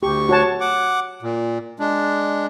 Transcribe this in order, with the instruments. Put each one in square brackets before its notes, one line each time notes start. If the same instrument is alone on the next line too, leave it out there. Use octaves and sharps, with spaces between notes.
[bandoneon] D2 C#6 [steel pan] G4
[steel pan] F#4 C#5 A5
[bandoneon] F#5 D6
A#2
G#3 D4